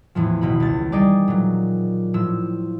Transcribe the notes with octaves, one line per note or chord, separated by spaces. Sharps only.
E2 A2 E3 F3
G#1 B2 B5
C#2 A6
G3 D#4 G#4 D5
A#2 F#3
A2 F3 E6